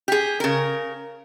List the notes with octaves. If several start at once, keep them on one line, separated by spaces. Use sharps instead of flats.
G4 G#4
C#3 A#4